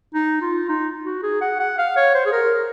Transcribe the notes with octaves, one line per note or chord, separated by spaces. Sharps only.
D#4
F4
D#4
F#4
G#4
F#5
F#5
F5
C#5
C5
G#4
A#4